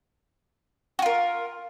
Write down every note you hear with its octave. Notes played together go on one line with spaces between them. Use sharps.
F4 F#4 A#4